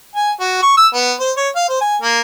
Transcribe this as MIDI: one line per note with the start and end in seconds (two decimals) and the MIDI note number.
0.15 0.32 80
0.40 0.61 66
0.63 0.73 85
0.77 0.88 88
0.94 1.12 59
1.20 1.31 72
1.37 1.49 73
1.56 1.66 77
1.69 1.79 72
1.81 1.97 80
2.02 2.21 58